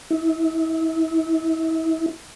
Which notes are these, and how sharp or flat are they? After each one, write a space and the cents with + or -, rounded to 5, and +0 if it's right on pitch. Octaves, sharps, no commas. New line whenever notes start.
E4 -35